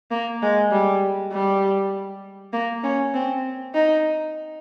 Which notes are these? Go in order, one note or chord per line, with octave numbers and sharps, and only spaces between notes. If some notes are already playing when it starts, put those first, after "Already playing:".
A#3
G#3
G3
G3
A#3
C#4
C4
D#4